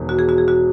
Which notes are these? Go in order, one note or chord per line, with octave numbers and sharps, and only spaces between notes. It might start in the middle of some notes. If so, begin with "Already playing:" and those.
Already playing: E1 E2 D#3
F#4
G#4
F#4
G#4
F#4